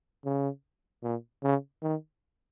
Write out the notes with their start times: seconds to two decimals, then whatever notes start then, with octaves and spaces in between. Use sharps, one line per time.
0.25 C#3
1.03 A#2
1.43 C#3
1.83 D#3